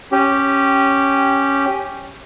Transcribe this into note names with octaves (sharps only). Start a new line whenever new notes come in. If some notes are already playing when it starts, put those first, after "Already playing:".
C#4 G4